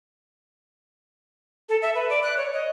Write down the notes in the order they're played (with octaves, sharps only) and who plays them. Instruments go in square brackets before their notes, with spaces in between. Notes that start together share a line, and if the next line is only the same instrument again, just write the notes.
[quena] A4
E5
B4
D5
F#6
C#5
D#5